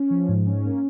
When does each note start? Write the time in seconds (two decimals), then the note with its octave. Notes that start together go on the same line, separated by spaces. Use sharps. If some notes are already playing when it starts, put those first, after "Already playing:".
Already playing: C#4
0.10 F3
0.28 G#2
0.46 C#4
0.65 A#3